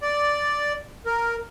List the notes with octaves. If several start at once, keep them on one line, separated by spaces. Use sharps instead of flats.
D5
A#4